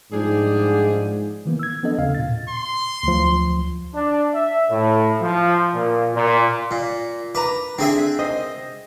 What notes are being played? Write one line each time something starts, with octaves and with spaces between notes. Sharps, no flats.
G#2 F3 G3 D4 G#4
D#3 E3 A#3 B3
E6 G#6
F3 B3 C4 D4 A4 D#5
D#2 C#3 F5
A#2 A6
C6
D2 F3
D4
E5
A2
F3
A#2
A#2
A#2
B4 A#5 D6
D3 C4 G#4 E5
C5 D#5 D#6